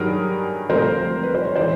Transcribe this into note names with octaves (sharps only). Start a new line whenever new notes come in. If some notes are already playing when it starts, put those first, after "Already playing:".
Already playing: G2 D#3 F#3 G#4 A#4
D2 C3 F3 A#4 C5
B4
C5
C#5
E3 G#3 C5 D5